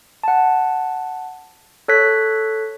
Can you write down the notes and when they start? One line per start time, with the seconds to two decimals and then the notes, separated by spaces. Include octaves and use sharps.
0.24 F#5 A5
1.88 A4 C#5 F#6 B6